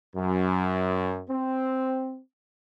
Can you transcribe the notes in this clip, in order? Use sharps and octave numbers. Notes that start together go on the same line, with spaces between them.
F#2
C4